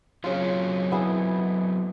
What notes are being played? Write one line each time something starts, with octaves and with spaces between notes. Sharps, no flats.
C#3 F#3 A#3 C4 F4
B3 E4 G#4